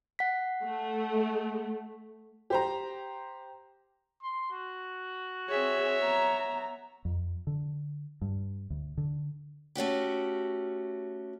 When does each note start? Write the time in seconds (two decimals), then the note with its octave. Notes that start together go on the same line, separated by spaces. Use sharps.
0.19 F#5 B6
0.64 A3
2.50 G4 C5 A#5
4.22 C6
4.52 F#4
5.49 C4 G#4 C#5 E5
6.01 B3 A#5
7.05 F2
7.47 D3
8.22 G2
8.70 D2
8.97 D3
9.75 A3 C#4 F#4 G4